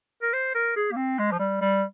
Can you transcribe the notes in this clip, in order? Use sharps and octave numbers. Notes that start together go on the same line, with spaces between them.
A#4
C5
A#4
G#4
A#3
C4
G#3
F3
G3
G3